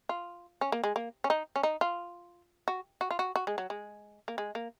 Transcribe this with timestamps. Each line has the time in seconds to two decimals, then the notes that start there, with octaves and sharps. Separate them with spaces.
0.09 F4
0.61 C#4
0.72 A#3
0.84 G#3
0.96 A#3
1.24 C#4
1.30 D#4
1.56 C#4
1.63 D#4
1.81 F4
2.68 F#4
3.01 F#4
3.11 F4
3.19 F#4
3.36 F#4
3.47 G#3
3.58 F#3
3.70 G#3
4.28 A#3
4.38 G#3
4.55 A#3